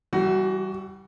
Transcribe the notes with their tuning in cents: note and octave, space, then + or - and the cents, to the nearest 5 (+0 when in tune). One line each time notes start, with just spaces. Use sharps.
E3 +0 G3 -20 F#4 +20